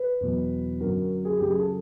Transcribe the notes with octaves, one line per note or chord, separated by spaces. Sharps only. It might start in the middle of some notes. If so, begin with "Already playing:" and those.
Already playing: B4
E2 B2 F#3
F#2 D3 F#3 A#4
G#4
F#2 C#3 F#3 G4
G#4
A4